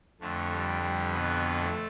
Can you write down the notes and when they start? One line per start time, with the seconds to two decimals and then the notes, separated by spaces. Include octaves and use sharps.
0.20 F2 D3 A3
0.52 G3
0.82 G3
1.13 B2 B3
1.59 A3